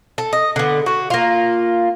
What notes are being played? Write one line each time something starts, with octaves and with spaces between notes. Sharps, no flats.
A4
D#5
D3 B3
F#4
A#3 F4